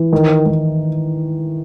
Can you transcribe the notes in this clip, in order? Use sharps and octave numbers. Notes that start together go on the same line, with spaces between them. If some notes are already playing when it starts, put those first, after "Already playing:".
Already playing: E3
D#3
D#3